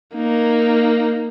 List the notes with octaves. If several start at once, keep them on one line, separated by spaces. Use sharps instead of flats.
A#3 D#4